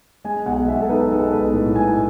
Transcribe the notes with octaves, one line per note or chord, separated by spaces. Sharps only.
G#3 G#5
B1 F#5
B1 E5
A4
D#4 B4
G#3 A4
B1 B4
A2
A2 G#5